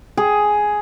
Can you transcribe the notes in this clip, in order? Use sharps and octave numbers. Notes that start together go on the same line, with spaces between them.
G#4